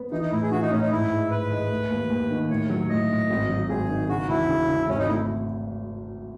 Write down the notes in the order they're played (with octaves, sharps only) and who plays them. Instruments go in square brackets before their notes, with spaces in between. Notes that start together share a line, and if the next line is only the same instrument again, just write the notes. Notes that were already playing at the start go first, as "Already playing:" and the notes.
Already playing: [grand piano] B3
[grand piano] E3 [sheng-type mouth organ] D#4
[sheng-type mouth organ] D#4
[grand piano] A2 [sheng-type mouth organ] E4
[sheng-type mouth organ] G#4
[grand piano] E3 [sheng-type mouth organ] F#4
[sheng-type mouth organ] D#4
[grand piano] A2 [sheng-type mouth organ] C#4
[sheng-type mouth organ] D#4
[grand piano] G#2 [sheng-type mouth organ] E4
[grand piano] G#3
[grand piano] G#2 [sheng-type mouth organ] B4
[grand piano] G#3
A3
D#2
D#2
D#3
[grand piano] A2 [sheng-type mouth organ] C#5
[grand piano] F#3
[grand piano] A2 [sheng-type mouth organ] D#5
[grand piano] A2
G#1
F#3
[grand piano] G#1 [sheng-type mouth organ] G#4
[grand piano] D#3
[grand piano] C#3 [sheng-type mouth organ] F#4
[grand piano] E1 [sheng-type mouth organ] E4
[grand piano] C#3
C#3
[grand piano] G#1 [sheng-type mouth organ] C#4
[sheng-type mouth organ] D#4
[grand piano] A3 [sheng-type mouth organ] E4